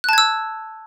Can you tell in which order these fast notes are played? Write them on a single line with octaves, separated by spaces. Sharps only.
F#6 A5 G#6 E6